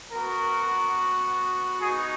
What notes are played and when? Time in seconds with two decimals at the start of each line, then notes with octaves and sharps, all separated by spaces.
0.12 B3 F#4 A#4
1.81 B3 D#4 F#4 G#4